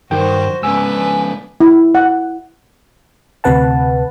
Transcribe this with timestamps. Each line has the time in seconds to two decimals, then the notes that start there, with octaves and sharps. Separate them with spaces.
0.11 G2 D#3 F#4 C5 G5
0.63 G#2 C#3 D4 B4 G#5 E6
1.60 E4
1.95 F#5
3.44 D2 C3 B4 F#5 A5